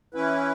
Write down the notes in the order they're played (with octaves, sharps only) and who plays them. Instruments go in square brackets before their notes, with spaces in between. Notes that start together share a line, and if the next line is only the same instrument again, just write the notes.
[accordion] E3 C#4 E4 B4